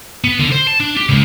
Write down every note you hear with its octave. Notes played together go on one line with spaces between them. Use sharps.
B3
D3
C5
A5
D4
G4
C#2